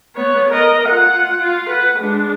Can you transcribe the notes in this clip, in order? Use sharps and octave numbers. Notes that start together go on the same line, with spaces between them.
B3 C#5
A#4 D#5
F4 F#5
F4
B4 F#5
G#3 D4